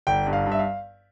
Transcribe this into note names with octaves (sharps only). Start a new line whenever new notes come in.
G1 G5
G2
F5
G2
E5
F5